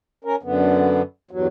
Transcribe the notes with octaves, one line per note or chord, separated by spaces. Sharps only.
C#4 A#4
F#2 D3 B3
E2 G2 F#3